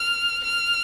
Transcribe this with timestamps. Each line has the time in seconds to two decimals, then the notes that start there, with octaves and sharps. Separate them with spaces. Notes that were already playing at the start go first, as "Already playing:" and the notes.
Already playing: F6
0.44 F6